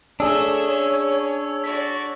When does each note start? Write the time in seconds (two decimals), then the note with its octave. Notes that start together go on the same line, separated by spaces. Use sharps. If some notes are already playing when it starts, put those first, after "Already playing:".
0.20 A3 D4 G#4 C#5 E5 E6
0.64 C#4
1.64 F#4 D5 B6